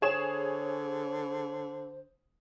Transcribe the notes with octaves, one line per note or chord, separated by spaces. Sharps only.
D3 G#4 C5 C#5 E7